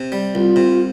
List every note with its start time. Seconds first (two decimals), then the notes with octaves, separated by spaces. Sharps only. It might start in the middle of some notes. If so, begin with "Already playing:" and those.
Already playing: C3
0.12 G3
0.34 C2 F4
0.56 C3